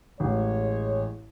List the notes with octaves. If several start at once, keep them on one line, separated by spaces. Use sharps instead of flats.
A1 G#3 C#5